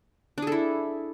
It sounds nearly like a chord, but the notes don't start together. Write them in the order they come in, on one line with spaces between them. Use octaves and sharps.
D4 G#4 A4 E4